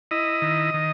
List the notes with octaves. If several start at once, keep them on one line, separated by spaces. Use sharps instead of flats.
E4 D#5
D#3
D#3